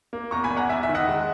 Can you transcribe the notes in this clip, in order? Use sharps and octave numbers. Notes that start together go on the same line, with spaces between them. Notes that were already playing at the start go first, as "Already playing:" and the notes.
A#3
E2 A#5 C#6
G#5 B5
E2
F#5 A#5
E2 E5 G#5
E5
D#3
D#5 F#5
G#3